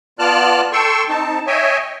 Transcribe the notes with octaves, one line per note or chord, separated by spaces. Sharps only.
B3 F4 D5 A5 F6 F#6
A4 G5 C6 C#6 E6
C4 D#4 A5
C#5 D#5 E5 G5 G#5